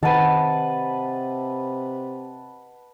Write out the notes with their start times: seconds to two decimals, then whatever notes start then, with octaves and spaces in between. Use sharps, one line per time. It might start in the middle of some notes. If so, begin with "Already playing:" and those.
0.03 C3 D#3 B4 D#5 F#5 A5 D#7